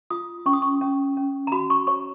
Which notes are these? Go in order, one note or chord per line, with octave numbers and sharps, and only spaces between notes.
F4 D#6
C#4 C#6
D#6
C#6
C#4
C#4
A#5
F#4 B5
C#6
C#5 C#6